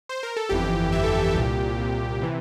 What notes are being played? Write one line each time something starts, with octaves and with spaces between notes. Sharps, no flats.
C5
A#4
A4
G1 F2 E3 G4
G1 F2 E3 E5
A4
G4
G4
C2 A#2 G4
C2 A#2
C3 E3